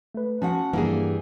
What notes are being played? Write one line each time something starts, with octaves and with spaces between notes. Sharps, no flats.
A3 B4
F3 C#4 F#4 F#5
G2 E3 G3 A#3 G#4